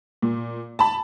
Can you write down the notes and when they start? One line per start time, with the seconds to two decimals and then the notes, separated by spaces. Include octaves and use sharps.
0.22 A#2
0.79 A5 B5